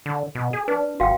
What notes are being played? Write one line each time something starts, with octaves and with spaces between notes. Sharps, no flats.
D3
B2
G#4
D4 B4
G1 F#4 F5 G5